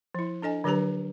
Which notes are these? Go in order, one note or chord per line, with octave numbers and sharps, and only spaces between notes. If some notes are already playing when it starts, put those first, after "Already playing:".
F3 E4
D4 A4 D#5 G#5
D3 F#3 D4 G4 B4 A#5